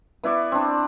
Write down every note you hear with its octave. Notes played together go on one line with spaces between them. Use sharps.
B3 E4 D5 C#6
C4 D4